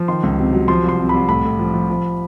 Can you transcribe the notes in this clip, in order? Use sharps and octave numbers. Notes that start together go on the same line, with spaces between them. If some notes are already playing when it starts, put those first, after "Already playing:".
Already playing: F3
D#3 C6
C#2
C3
F#3
F3 C6
C2
C6
C3
C2 B5
A2 B5
A2
F3
F3
F3